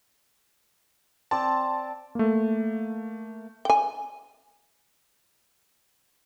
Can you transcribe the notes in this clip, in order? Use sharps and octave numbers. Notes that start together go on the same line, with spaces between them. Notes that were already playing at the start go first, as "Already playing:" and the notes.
C4 D5 A5
A3 A#3
G5 G#5